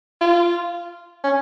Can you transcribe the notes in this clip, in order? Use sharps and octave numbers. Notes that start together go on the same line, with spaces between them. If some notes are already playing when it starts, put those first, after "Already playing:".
F4
C#4